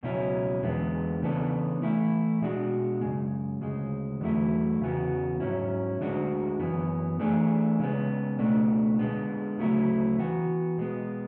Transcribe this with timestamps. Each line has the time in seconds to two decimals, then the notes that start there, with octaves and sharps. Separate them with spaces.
0.03 C#2 B2 F#3 C#4 E4
0.62 E2 D3 G#3 B3
1.22 C#3 E3 B3 D4 A4
1.82 E3 A3 E4
2.41 B2 G#3 D4 F#4
3.01 F#2 C#3 G#3
3.61 D2 C#3 G#3
4.21 E2 D3 F#3 A3 E4
4.80 E2 C#3 E3 B3 F#4
5.40 G#2 F#3 C#4 E4
6.00 D2 D3 G#3 D4 F#4
6.59 F#2 E3 B3
7.19 E3 A3 D4 G#4
7.79 C#3 G#3 B3
8.38 C#2 B2 A3 D4
8.99 D3 G#3 B3
9.58 D2 C#3 F#3 A3 E4
10.18 E3 B3 F#4
10.78 B2 G#3 B3